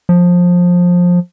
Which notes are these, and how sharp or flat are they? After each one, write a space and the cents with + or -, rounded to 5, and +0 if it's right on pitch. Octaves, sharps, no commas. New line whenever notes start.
F3 +20